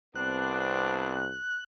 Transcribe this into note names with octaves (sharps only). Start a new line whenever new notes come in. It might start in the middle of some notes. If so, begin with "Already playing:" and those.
C2 B3 C4 D4 F#6